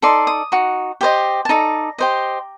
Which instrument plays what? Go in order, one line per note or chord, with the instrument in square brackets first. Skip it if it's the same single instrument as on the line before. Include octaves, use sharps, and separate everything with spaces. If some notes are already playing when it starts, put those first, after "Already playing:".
[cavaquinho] D#4 A4 D5 C6
D#6
D#4 F#4
G4 C5 D#5
A5
D#4 A4 D5 A#5
G4 C5 D#5